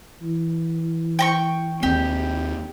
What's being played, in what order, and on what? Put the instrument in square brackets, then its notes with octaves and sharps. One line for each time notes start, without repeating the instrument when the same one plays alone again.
[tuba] E3
[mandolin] G5 A#5 C#6
[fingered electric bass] D#2 C4 [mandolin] G4